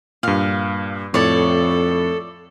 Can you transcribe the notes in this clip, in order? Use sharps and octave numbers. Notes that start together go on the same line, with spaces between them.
G2 A#2 F5
F2 A2 A4 C#5 D5